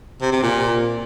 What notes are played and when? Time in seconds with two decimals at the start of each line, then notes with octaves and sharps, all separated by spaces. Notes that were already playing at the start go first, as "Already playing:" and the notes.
0.22 C3
0.32 C3
0.43 A#2